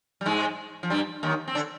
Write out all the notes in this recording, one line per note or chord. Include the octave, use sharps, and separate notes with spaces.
G3
G#2 G#3
F3
G2 G3
D#2 D#3
C4
D3 D4